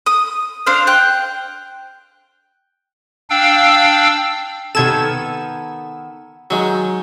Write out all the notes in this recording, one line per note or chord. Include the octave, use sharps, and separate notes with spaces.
D#6
D4 C5 F5
G5 F#6
D4 F5 G5 E6
C3 D#3 B3 A4 G#6 E7
D#3 F#3 G#3